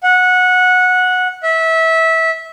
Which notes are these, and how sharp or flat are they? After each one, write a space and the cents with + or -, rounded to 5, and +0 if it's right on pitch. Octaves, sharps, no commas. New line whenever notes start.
F#5 -15
E5 -20